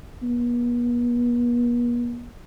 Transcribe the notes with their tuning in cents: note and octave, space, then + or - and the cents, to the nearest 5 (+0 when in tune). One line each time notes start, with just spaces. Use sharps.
B3 -45